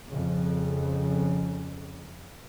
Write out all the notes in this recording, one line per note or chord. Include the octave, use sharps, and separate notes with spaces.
F2 C#3